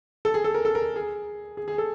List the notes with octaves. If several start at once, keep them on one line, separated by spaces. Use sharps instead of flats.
A4
G#4
A4
A#4
A4
A#4
G#4
G#4
G#4
A4